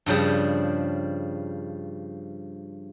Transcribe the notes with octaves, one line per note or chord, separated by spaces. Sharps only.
G2 C#3 F3 G3